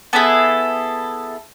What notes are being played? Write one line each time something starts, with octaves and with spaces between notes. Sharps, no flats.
B3 E4 G#4 A4